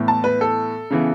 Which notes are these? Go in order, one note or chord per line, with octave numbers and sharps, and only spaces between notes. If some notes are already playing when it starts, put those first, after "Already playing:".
Already playing: A2 E3 B3
A5
B4
A4
C#3 E3 B3